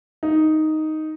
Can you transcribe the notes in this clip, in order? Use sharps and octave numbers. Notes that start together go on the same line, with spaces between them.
D#4